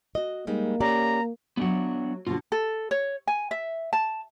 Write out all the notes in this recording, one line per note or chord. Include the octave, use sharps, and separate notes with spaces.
F#4 D#5
G3 G#3 A#3 D#4
C#4 G4 D5 A#5
F#3 A3 B3 D4 F#5
B2 D3 F4 F#4
A4
C#5
G#5
E5
A5